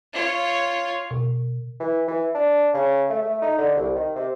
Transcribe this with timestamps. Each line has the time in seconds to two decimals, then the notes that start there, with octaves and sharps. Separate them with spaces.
0.13 F4 C#5
1.11 B2
1.80 E3
2.08 E3
2.35 D4
2.74 C#3
3.09 A3
3.22 A3
3.42 D#4
3.58 D3
3.76 C2
3.95 D#3
4.16 C3